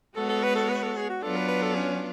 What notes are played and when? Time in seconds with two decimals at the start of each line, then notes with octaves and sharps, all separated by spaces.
0.16 G#3 B3 F#4 A4 C#5
0.29 A4
0.43 B4
0.55 A4
0.69 B4
0.83 A4
0.96 G#4
1.09 F#4
1.22 F#3 B3 D4 F4 A4
1.36 B4
1.48 B4
1.62 A4
1.74 C#4